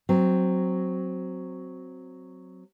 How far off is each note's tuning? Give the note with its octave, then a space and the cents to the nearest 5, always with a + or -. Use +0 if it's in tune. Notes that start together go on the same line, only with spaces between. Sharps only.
F#3 +0 C4 +0